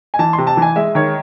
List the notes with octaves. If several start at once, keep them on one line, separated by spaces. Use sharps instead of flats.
G#5
E3 A5
C6
C3
A5
E3
G#5
G#3 E5
D#3 C#5